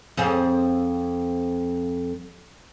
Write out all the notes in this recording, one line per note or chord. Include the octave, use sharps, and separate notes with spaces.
F2 C4 G#4